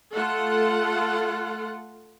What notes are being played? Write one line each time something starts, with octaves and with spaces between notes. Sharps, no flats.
A3 F4 A4 F#5